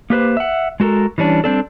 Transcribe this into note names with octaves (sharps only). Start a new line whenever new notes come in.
A#3 G4 B4 C5
E5 F#5
G#3 F#4 A4 A#4
E3 G3 C#4 D4
G3 C4 D4 A4